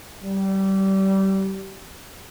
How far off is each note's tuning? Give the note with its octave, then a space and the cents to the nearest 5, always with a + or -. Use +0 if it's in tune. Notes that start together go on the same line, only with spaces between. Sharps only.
G3 -25